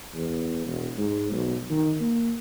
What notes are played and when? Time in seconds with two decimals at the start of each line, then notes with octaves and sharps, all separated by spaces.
0.14 E2
0.65 E1
0.98 G#2
1.31 B1
1.70 D#3
2.01 A#3